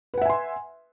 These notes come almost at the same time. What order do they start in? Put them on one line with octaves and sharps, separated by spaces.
B4 F#5 E5 G#5 C6